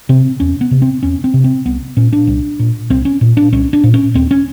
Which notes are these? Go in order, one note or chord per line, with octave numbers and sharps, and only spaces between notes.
C3 C4
E2 C#4
B3
C3
C4
E2 C#4
C4
C3
C4
C2 B3
A#2 C#4
D4
C2
A#2
C2 C4
C#4
A#2
D4
C2 C#4
D4
A#2
C#4
D#2 C4
C#4